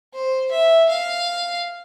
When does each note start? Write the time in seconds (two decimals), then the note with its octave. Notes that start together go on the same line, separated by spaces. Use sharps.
0.13 C5
0.51 E5
0.89 F5